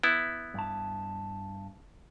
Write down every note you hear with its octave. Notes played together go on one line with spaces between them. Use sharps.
B3 E4
G2 A5